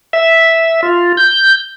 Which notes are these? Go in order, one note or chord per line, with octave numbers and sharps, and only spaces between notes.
E5
F4
G6